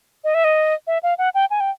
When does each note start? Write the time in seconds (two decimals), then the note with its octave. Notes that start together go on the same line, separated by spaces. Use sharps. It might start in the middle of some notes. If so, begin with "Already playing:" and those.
0.24 D#5
0.34 E5
0.44 D#5
0.87 E5
1.03 F5
1.18 F#5
1.34 G5
1.50 G#5
1.60 G5